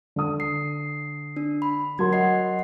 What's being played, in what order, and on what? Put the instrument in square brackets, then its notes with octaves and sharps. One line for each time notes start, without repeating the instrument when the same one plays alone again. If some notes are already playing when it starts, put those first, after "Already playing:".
[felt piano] D3 D#6
[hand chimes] C7
D4
B5
[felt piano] F#3 A#4 C6 [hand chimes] G#6
[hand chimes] D#5 F#5 C7